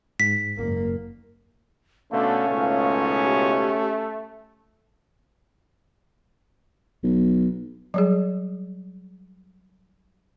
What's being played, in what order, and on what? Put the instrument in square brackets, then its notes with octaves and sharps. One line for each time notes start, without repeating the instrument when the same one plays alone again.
[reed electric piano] G#2 [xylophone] B6
[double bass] F#1 A#3
[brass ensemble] B2 D3 [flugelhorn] A3 [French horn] C#4 [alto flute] F5
[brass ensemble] C#2 G#2 B2 [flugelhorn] A3
[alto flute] G4
[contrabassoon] B1
[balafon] F#3 G3 G#4